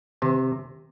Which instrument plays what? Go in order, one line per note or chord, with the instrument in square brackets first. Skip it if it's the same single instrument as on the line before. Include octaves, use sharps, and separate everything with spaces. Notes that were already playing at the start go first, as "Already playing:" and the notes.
[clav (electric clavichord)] C3 [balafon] D#3